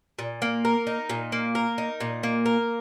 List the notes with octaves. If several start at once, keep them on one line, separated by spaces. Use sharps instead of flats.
A#2
A#3
A#4
D#4
A#2
A#3
A#4
D#4
A#2
A#3
A#4